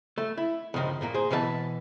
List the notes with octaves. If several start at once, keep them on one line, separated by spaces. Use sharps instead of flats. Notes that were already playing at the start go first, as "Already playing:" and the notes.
A3
E4
C#2 G2 D#3 F3
G2 A#2 A#3
G#4 C5
B2 E3 B4 D#5 A5